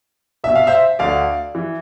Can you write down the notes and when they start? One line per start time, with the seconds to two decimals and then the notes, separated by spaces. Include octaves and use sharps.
0.44 C2 B2 E5
0.55 F5
0.67 C5 E5
0.99 D2 D3 D5 F5
1.55 E3